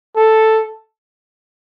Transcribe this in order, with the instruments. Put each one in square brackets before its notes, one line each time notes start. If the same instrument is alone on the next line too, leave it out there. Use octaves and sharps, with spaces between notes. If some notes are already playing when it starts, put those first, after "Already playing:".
[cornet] A4